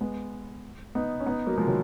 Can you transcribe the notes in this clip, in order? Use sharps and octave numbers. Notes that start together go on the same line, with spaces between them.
G#3 B3
B3 D#4
C#4
B3 D#4
F#3 A#3
F3 G#3
D#3 F#3